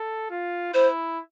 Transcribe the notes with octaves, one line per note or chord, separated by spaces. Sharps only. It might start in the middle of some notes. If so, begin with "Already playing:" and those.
Already playing: A4
F4
E4 C5